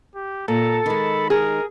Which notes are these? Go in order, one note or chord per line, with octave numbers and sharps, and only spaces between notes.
G4
A#2 A4 A#5
D#3 G#3 B5
G#4 A#4